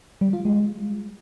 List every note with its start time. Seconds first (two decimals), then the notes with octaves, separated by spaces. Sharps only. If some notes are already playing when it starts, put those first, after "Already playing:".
0.21 G3
0.33 F4
0.45 G#3